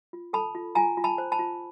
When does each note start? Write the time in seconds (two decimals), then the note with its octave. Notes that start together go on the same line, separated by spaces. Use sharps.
0.13 F4
0.33 A4 A5 B5
0.55 F4
0.75 F4 G#5 A#5
0.97 F4
1.04 A5 B5
1.18 C5
1.32 A5 B5
1.39 F4